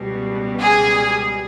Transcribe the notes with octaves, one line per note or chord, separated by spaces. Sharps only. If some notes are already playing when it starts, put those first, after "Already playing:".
Already playing: C#2 B2 G3
G#4